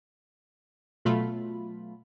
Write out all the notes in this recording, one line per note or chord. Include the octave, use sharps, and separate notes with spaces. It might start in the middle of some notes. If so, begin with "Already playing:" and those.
B2 F#3 A3 F4 B5